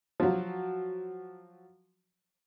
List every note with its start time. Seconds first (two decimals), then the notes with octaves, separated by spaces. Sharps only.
0.20 F3 F#3